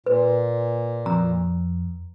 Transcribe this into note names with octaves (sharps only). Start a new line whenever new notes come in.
A#2 B4
F2 A#5